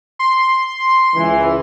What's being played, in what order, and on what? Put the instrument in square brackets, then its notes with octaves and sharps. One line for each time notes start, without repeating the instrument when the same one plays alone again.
[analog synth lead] C6
[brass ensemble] C#2 E3